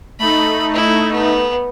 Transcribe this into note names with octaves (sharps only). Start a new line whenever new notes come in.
A3 D#4 B5
E4
B3